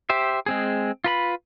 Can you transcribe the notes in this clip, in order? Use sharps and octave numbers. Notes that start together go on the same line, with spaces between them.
G4 C5 E5
G#3 C4 G#4
F4 B4 B5